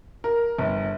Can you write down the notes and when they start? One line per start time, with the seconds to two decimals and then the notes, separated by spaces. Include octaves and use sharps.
0.24 A#4
0.59 G1